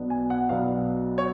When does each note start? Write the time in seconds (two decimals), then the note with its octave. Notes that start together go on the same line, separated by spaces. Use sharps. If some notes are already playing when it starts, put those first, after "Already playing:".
Already playing: B1 B2 F#3 B3 D4
0.10 G#5
0.30 F#5
0.49 B1 B2 F#3 B3 D4 F5
1.18 C#5